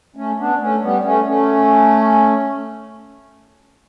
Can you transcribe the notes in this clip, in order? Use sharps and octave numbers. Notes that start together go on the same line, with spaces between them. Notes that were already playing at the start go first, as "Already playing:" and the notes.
A3 C#4
B3 D4
A3 C#4
G3 B3
A3 C#4
A3 C#4